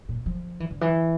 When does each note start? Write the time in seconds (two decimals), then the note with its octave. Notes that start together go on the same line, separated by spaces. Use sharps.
0.09 A#2
0.26 F3
0.60 E3
0.70 D3
0.81 E3